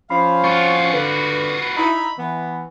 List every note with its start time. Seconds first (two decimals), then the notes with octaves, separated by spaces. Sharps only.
0.10 F3 C#4 F5 B5 C7
0.44 F4 F#4 C#6
0.93 D3 B4
1.61 B4
1.77 D#4 E4 B5
2.19 E3 B3